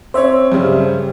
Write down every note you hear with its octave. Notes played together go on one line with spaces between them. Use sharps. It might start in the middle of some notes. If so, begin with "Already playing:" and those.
C4 C5 C#5 E5
G2 C#3 G3